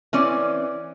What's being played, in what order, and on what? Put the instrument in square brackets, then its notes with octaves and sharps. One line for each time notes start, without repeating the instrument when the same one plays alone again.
[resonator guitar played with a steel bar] E3 C4 C#4 D5